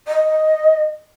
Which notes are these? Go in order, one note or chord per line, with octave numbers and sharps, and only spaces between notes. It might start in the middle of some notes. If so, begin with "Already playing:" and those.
D#5